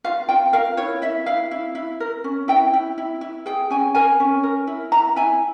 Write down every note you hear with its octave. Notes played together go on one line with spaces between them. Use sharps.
F4 F5
F4 G5
A#4 F5
E4 C#5
E4 E5
E4 F5
E4
E4
A#4
C#4
E4 G5
E4
E4
E4
G#4 G5
C#4 G#5
A#4 G#5
C#4
A#4
E4
E4 A#5
E4 G#5